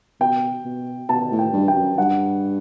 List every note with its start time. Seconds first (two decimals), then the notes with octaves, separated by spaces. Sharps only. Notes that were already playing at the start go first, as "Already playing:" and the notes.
0.20 B2 G5
0.65 B2
1.09 B2 A5
1.31 A2
1.39 G5
1.53 G2
1.68 G5
1.76 F#2
1.98 G2 F#5